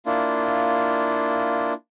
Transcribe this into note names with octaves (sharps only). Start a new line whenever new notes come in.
A#3 D4 E4 F4